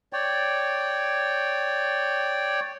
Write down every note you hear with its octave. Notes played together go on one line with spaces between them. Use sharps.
C#5 D5 G5